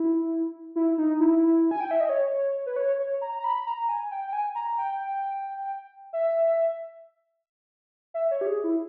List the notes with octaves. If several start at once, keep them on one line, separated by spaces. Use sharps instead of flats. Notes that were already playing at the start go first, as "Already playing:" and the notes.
Already playing: E4
E4
D#4
E4
G#5
G5
E5
D#5
C#5
B4
C#5
C#5
A#5
A#5
B5
A#5
G#5
G5
G5
G#5
A#5
G5
E5
E5
C#5
G4
G#4
E4